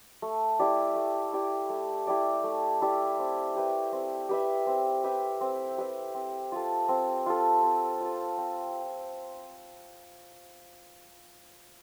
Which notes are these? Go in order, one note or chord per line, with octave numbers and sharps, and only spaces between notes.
A3
E4 G4 D5
A3
E4 G4 D5
A3
E4 G4 D5
A3
E4 G4 D5
C4
G4 B4 E5
C4
G4 B4 E5
C4
G4 B4 E5
C4
G4 B4 E5
C4
F4 A4
C4
F4 A4
C4
F4 A4
C4